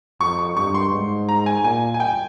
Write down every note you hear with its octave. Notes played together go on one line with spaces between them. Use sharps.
F2 C#6
C#6
G2 C#6
C6
G#2
A#5
G#5
A#2 G#5
G#5
G5